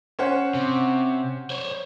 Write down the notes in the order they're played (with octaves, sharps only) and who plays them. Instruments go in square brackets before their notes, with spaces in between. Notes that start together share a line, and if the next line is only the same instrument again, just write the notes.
[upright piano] C#4 C5 F#5
[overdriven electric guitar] C3
C5 C#5